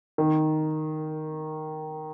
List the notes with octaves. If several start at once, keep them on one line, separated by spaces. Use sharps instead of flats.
D#3